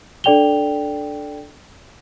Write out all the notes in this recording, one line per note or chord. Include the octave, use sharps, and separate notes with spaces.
D4 A4 D5 G5 F7 G7